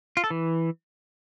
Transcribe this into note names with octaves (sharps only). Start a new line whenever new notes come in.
F4
A4
E3